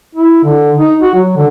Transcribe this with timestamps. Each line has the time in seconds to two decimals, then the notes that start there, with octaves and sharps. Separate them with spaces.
0.15 E4
0.44 D3
0.77 D#4
1.02 F#4
1.15 F#3
1.37 D3